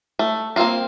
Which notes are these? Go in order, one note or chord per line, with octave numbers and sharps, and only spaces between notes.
A3
A#3 C4 E4 F4 A#4